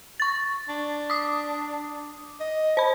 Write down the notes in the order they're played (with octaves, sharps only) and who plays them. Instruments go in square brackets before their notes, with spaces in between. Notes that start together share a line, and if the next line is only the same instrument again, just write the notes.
[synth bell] C#6 A6
[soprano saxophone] D4
[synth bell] D6 D#6
[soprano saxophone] D#5
[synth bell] C5 B5